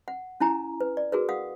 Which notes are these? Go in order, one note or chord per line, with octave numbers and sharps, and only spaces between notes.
F#5
C#4 E4 G#5 A#5
B4
D5
F#4 G#4 A#4 B4
F5 F#5 D#6